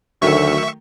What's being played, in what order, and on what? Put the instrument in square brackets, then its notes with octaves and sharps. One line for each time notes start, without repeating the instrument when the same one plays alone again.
[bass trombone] D2 [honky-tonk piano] D#3 F#3 A3 [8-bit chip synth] E5 C#6